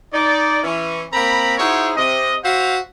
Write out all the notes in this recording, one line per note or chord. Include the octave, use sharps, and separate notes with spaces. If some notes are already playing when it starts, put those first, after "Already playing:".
D#4 D5
E3 C#4
A#3 C4 A#5 B5
D#4 E4 F#4 G#4 C5 C#5
C3 D#5
F#4 C5 E5 F5